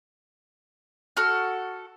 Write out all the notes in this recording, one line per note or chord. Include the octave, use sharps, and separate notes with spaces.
F#4 A4 F6